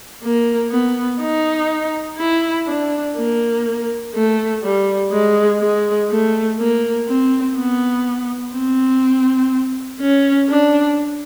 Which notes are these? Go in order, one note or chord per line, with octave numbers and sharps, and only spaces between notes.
A#3
B3
D#4
E4
D4
A#3
A3
G3
G#3
G#3
A3
A#3
C4
B3
C4
C#4
D4